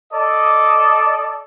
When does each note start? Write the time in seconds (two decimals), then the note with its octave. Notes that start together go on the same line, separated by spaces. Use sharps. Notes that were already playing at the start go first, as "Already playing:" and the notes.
0.13 A4 D5 D#5